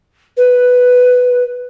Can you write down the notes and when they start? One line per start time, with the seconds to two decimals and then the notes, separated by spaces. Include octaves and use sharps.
0.37 B4